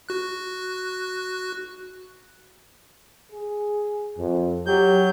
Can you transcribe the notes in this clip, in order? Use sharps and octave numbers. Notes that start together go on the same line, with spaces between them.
F#4 F#6
G#4
F2
F#3 G4 G6